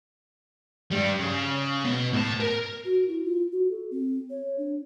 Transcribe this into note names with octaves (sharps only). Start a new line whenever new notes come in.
G2 G3
C#3
B2 B3
A2 A5
A#4
F#4
E4
F4
F#4
A4
C4
C#5
D4